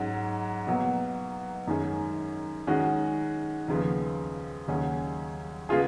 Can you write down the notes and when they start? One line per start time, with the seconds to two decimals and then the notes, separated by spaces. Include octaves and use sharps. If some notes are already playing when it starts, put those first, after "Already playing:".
Already playing: G#2 F#3 C#4
0.67 B2 F#3 A#3
1.67 F#2 D#3 G#3 C#4
2.67 D#3 G#3 C#4 F#4
3.68 D#2 C#3 F3 B3
4.68 D#2 C#3 F#3 C#4
5.69 C#3 G#3 B3 F4 G#4